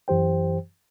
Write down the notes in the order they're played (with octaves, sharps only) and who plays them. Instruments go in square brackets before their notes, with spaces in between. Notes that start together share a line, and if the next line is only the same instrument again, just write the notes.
[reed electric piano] F#2 E3 G4 C5 G5